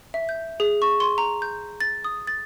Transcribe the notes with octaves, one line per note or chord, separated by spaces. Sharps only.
E5
G6
G#4
C#6
C6
A#5
G6
A6
D#6
A6